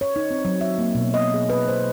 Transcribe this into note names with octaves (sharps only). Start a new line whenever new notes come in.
C#5
D#4
C4
F#3
E5
A#3
B2
D#5
G#4
B4
C5